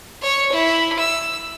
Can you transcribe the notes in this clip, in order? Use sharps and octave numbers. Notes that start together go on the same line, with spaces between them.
C#5
E4
E6